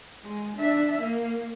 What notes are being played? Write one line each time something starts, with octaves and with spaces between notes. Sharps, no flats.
G#3
D4 E5
A#3